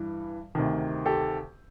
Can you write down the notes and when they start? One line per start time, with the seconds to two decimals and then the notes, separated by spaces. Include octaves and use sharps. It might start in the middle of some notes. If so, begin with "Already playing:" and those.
Already playing: G2 E3
0.55 D2 C3 D#3
1.06 G4 A4